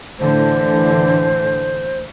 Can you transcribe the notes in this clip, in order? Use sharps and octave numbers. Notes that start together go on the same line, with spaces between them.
A2 D3 E3 C5